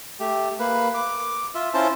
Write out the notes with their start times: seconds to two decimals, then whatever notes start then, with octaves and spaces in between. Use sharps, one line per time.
0.20 A3 G4
0.59 A#3 B4
0.94 D6
1.55 F4 E5
1.74 C#4 E4 F4 C5 A5